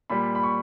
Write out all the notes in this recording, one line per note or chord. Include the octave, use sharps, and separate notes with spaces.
A#2 G3 B5
B5
C#6